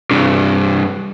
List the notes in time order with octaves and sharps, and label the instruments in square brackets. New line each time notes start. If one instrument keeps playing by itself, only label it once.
[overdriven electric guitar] C2 G2